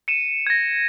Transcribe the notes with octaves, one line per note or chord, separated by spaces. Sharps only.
C#7 D#7 E7
G#6 A#6